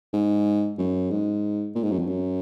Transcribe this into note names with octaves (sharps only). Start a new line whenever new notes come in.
G#2
F#2
G#2
A#2
G#2
F#2
F2
F#2